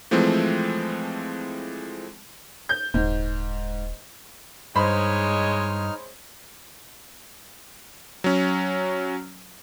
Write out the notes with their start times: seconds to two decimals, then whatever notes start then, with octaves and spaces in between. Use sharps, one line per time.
0.11 E3 F3 G#3 A3 C4
2.69 G6
2.94 D#1 G#2
4.76 G2 G#3 D#4 C5 C#5 B5 F6
8.24 F#3 C#4